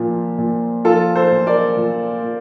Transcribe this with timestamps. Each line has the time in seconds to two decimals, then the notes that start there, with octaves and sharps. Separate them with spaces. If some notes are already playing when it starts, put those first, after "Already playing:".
Already playing: A#2 F3
0.38 A#2
0.85 F3 F4 A4
1.15 A4 C5
1.31 A#2
1.47 A#4 D5
1.77 A#2
2.23 A#2